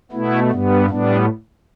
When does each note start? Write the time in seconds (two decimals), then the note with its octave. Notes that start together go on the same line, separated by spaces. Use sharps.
0.12 B2 A3 B3 E4
0.51 G2 G3 B3
0.90 A2 G3 B3 D4